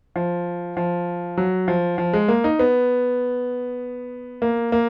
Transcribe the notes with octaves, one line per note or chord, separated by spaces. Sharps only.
F3
F3
F#3
F3
F3
G#3
A#3
D#4
B3
A#3
A#3